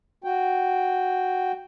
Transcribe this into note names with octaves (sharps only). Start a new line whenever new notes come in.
F#4 G5